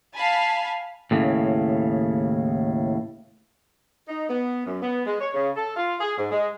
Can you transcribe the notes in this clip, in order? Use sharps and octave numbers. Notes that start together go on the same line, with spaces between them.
F5 G#5 A5 B5
D#2 A2 C#3
D#4
B3
F#2
B3
G#3
C#5
C#3
A4
F4
G#4
G#2
G#3